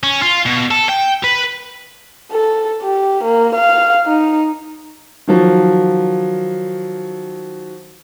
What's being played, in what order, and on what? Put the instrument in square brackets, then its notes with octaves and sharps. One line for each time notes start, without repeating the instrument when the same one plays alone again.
[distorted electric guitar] C#4
F4
B2
A4
G5
B4
[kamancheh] A4
G4
A#3
F5
D#4
[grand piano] D#3 F3 F#3